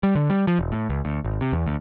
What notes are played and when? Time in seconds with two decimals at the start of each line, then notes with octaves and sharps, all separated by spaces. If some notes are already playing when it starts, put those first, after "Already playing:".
0.03 G3
0.15 D3
0.30 G3
0.47 F3
0.59 E1
0.72 A2
0.89 C#2
1.05 D2
1.25 G#1
1.41 C3
1.53 E2
1.66 D2